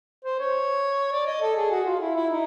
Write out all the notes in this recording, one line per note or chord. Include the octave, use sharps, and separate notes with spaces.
C5
C#5
D5
D#5
A4
G#4
F#4
F4
E4
E4
D#4